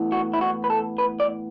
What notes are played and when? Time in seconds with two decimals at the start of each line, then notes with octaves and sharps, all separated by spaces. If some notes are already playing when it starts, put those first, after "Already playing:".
Already playing: A2 E3 B3
0.12 F#4
0.34 E4
0.41 F#4
0.64 B4
0.70 A4
0.98 B4
1.20 D5